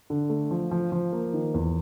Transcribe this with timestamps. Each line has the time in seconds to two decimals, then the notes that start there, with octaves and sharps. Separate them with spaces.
0.10 D3
0.30 A3
0.51 F3
0.71 F3
0.92 F3
1.12 A#3
1.33 D#3
1.54 E2